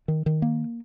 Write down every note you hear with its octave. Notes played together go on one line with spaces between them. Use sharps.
D#3
D#3
A#3